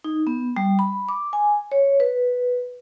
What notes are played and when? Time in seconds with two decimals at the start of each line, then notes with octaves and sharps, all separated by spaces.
0.04 D#4
0.27 B3
0.56 G3
0.79 B5
1.09 D6
1.33 G#5
1.72 C#5
2.00 B4